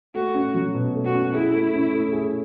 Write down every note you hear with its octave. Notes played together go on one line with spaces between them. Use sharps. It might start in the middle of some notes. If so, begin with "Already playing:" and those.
A3 F#4
C#4
F#3
B2
A3
F#4
C#4
E4 G#4
A3
C#4
A3
G#4